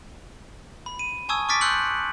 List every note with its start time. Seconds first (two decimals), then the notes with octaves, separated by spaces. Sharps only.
0.86 B5
0.99 D#7
1.29 G#5 A5 C#6 D#6 E6 G#6
1.49 C#6 D6 F6 A6 B6 D7
1.61 C6 E6 F#6 G6 C#7 F#7